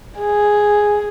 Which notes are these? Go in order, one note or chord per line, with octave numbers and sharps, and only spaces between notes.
G#4